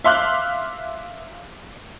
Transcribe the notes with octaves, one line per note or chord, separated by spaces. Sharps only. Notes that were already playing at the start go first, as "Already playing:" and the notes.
E5 F5 C6 D6 F6 F#6